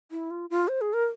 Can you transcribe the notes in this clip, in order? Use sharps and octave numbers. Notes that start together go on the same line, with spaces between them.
E4
F4
F4
C5
G#4
A#4